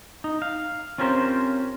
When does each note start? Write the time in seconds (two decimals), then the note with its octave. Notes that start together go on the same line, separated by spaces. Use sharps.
0.24 D#4
0.42 F5
0.98 C4 C#4 F4 G4 A#4 C5